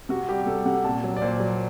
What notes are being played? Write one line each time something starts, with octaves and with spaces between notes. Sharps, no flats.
C3 F#4
G3 G4
C3 A4
C3 F#5
A#2 A5
F#3
D5
A#2 C5
F#3